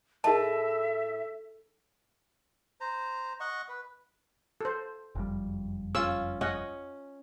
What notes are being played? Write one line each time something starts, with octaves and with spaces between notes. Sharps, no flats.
A2 D#4 G#4 A#4 D#5 E5 A5
C5 A#5
D#5 F#5 C#6
B4
A4 C5
F#1 F2 G3
C#4 F4 E6
C#4 D#5 F#5